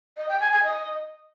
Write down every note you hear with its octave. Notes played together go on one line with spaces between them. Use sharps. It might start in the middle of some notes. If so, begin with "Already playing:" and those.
D#5
G5
G#5
G#5
D#5